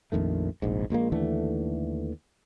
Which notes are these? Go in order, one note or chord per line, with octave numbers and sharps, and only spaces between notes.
A#1 F2 D#3 A3
F1 A#1 G#2
A#1 A#2 G#3 A#3
D#2 D3 E3 A3